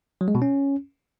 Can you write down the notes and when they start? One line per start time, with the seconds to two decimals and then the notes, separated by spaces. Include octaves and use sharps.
0.21 F#3
0.28 G#3
0.35 B2
0.42 C#4